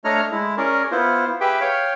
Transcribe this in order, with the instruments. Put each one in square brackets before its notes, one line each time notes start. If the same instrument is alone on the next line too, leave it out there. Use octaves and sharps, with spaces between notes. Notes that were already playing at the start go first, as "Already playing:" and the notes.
[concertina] A3 D4 C#5 D#5 A#5 F6
G#3 E4
C#4 G#4 A#4 D5
B3 E4 F4 C5
G4 G#4 B4 E5 G5
C#5 F5 G5